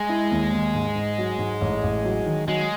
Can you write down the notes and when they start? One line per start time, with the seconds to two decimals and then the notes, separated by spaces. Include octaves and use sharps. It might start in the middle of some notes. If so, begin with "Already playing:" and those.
Already playing: G#3
0.09 E4
0.31 D#2
0.53 D#2
0.75 G#2
0.96 G#2
1.18 F#3
1.39 G#2
1.61 A1
1.83 A1
2.05 F#3
2.26 D#3
2.48 F#3 G#3